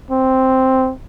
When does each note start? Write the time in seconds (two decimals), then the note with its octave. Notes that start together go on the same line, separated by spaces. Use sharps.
0.10 C4